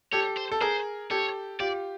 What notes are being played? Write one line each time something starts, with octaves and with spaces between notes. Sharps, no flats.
G4 A4 C#5
C5
A4
G#4 A#4 C5
G4 A4 C#5
F4 G4 D5